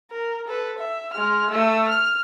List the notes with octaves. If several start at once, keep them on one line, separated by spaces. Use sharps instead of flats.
A#4
A4 B4
E5
G#3 F6
A3 E6
F6